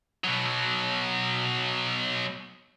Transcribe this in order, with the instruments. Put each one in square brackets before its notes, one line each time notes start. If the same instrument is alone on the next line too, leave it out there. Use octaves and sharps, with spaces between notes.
[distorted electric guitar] B2 F#3